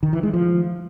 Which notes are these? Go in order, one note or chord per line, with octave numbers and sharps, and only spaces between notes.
D#3
E3
G#3
F3